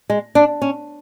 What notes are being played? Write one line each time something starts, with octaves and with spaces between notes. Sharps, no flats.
G#3
D4
C#4